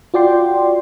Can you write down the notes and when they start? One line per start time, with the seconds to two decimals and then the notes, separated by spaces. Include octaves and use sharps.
0.14 F4 F#4 D5 G5 C6